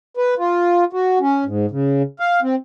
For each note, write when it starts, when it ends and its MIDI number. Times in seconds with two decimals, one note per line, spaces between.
0.17 0.34 71
0.38 0.84 65
0.93 1.19 66
1.20 1.44 61
1.46 1.66 44
1.71 2.02 49
2.20 2.40 77
2.42 2.55 60